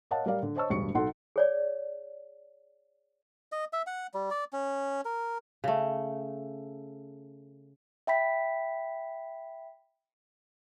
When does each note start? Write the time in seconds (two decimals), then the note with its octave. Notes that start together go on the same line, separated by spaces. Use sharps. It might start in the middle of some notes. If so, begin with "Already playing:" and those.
0.11 A#4 C#5 D#5 F5 F#5 A5
0.26 G3 A#4 D5 F5
0.43 D3
0.56 C5 C#5 D#5 A5 C#6 E6
0.70 E1 D2 G2 C#6 C#7
0.95 B1 D#4 A4 F#5 C6
1.36 G#4 C#5 D5
3.52 D#5
3.73 E5
3.87 F#5
4.14 G3
4.31 D5
4.53 C#4
5.05 A#4
5.64 C#3 A3
8.07 E5 G5 B5 B6